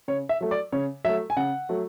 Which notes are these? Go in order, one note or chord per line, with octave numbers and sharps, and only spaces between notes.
C#3 C#5
E5
F#3 A3
D5
C#3 C#5
F#3 A3 E5
G#5
C#3 F#5
F#3 A3